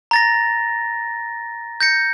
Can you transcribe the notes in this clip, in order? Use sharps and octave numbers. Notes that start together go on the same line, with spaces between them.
A#5 A6 A#6
G6 A#6 C#7